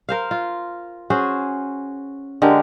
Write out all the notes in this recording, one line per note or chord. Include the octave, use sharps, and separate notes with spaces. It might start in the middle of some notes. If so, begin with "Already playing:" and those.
A#4 C5 F5
F4
C#4 F#4 G#4 C5
D3 G#3 G4 A#4